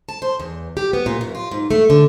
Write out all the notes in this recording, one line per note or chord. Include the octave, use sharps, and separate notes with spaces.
A5
C5
E2
G4
B3
A#2
F#2
F4
G#2
A3
D3